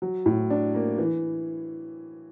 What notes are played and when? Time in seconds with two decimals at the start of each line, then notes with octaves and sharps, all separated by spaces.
0.02 F#3
0.26 A2
0.50 D4
0.74 A#3
0.98 E3